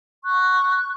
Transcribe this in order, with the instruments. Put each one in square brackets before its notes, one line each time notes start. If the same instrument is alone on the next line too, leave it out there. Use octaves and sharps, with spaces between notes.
[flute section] C#6 F#6